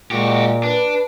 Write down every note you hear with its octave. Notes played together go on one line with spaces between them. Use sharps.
A#2 G#3 F#4 G4
D4 B4